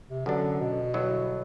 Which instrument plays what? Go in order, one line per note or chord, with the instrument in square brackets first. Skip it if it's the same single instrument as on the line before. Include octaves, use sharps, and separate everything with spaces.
[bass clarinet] C3
[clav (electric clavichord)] F#2 F#3 B3 D4 [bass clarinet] D3
[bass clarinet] B2
[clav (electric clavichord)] G2 D3 F#3 B3 E4